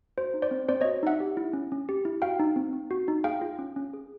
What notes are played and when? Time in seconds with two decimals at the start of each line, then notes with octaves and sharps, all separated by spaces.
0.18 F#4 C5
0.34 D#4
0.42 C5 D5
0.51 C4
0.69 C4 C5 D5
0.81 C#5 D#5
0.85 F#4
1.03 D#4 E5 F#5
1.20 G4
1.37 E4
1.53 C#4
1.72 C#4
1.89 G4
2.05 E4
2.22 F#4 F5 G5
2.39 D#4
2.56 C4
2.73 C4
2.91 F#4
3.08 D#4
3.24 G#4 F5 G5
3.42 F4
3.59 C#4
3.76 C#4
3.94 G#4